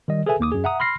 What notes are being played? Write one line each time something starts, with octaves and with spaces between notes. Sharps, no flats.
D#3 G3 D#5
G#4 A4 B4 E5 G#5
D#2 A#3 D6 D#6
F#2 G#4
E5 F#5 A#5 D#6
B5 C6 F6 A#6 C7